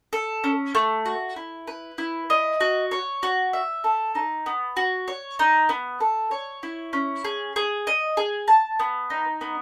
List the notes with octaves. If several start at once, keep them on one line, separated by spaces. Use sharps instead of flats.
A4
C#4
A3
F#4
E4
B4
E4
D#5
F#4
C#5
F#4
E5
A4
D#4
B3
F#4
C#5
D#4
B3
A4
C#5
E4
C#4
G#4
G#4
D#5
G#4
A5
B3
D#4
B3